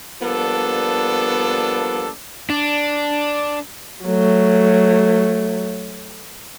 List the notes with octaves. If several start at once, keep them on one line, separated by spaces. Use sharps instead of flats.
F3 G3 A#3 B3 D4 A4
D4
F#3 A3